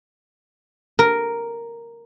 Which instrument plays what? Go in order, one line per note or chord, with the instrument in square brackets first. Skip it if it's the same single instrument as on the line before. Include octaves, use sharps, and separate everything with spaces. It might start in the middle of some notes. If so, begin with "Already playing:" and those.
[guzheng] A#4